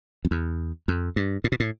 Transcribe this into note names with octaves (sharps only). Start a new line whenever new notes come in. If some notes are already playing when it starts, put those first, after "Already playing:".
F2
E2
F2
G2
A2
B2
A2